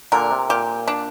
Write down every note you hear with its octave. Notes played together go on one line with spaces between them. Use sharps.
A#2 D3 A#4
C3
A#2 G4
D4